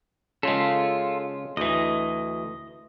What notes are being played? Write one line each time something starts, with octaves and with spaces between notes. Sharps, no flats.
C#3 G#3 F4 A4
D2 E3 D#5